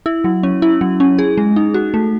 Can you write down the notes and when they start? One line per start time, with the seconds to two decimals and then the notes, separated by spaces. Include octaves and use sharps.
0.06 E4
0.24 F#3
0.43 C#4
0.62 E4
0.81 F#3
1.00 C#4
1.19 G#4
1.38 G#3
1.56 D#4
1.74 F#4
1.94 A3